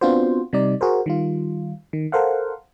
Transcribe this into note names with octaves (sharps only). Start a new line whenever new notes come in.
B3 C4 D4 F4 F#4 C5
C3 G3 D#4 D5
F#4 G#4 A#4 C5
D#3 G3 F4
D#3
A4 A#4 C5 F5 F#5